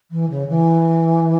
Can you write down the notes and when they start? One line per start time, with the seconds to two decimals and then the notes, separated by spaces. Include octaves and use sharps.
0.11 E3
0.30 C#3
0.48 E3